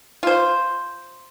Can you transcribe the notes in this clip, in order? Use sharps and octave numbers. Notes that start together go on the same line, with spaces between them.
F4 C5